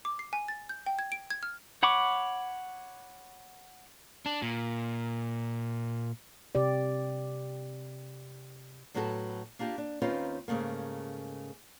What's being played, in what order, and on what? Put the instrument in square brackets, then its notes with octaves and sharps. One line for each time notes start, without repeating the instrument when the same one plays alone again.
[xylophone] D6
C7
G#5
A6
G6
G5
G#6
D7
G#6
F6
[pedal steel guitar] C#5 F#5 B5 C#6 D6
[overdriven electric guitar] D4
A#2
[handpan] C3 G4 D5
[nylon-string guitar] A2 F#3 B3 F#4 G4 A4
A#3 D4 F4 G4
D4
D#2 C4 C#4 D#4 F4 B4
G#2 C#3 A3 A#3